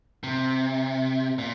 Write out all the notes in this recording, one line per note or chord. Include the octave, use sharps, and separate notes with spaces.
C3
A#2